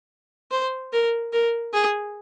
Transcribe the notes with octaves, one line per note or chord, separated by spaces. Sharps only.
C5
A#4
A#4
G#4